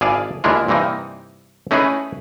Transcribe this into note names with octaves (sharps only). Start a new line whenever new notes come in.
G#1 E4 G#4 D5 F5 A5
D#2 G#3 A#3 D4 E4 F4
G2 C3 E3 A#3 D#4
A3 C#4 D#4 E4 G#4 B4